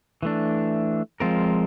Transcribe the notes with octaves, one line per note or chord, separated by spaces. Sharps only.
E3 A3 D4
F3 G#3 C4 F4 A#4